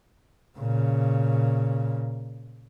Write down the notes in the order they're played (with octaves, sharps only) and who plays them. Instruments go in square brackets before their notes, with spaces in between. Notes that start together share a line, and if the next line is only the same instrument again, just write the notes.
[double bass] A#2 C#3